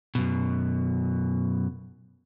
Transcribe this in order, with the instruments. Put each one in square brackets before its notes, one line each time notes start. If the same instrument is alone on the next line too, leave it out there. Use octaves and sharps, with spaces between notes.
[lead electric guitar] F#2 B2